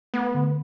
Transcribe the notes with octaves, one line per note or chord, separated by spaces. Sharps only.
A3 B3
D3